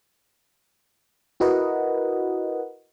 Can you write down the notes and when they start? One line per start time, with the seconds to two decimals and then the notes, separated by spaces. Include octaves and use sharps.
1.40 E4 F#4 A#4 B4 D#5 F#5